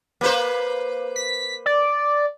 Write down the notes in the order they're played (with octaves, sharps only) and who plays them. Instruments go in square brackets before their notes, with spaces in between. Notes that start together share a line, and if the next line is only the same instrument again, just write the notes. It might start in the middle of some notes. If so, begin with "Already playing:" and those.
[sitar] A#3 B4 C5
[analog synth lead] B6
D5